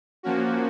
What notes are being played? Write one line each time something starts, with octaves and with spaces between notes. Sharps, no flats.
F3 A#3 C#4 F#4